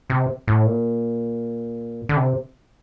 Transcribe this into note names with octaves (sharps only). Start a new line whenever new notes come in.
C3
A2
A#2
D3
C3